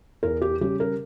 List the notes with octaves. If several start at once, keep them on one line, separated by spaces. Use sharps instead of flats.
E2 A#4
G4
C#3 G3 C#4 G4
A#4